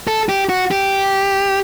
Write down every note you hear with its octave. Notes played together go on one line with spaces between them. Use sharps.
A4
G4
F#4
G4